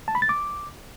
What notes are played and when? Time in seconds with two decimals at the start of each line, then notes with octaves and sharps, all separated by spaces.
0.08 A5
0.15 B5
0.22 A6
0.29 D6